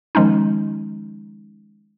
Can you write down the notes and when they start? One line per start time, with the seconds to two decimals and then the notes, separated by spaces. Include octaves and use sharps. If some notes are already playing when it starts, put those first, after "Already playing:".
0.15 D#3 F3 G#3 C#4 D#4